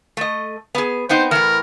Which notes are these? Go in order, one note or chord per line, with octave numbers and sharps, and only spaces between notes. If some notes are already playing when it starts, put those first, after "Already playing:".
A3 D#5
B3 G#4
B3 C4 D#4 C5
A2 E3 A#4